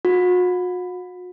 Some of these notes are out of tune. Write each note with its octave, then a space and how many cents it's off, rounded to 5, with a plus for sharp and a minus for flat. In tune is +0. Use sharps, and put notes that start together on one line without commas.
F#4 -40